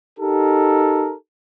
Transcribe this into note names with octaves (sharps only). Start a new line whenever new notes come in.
D#4 G4 A4 A#4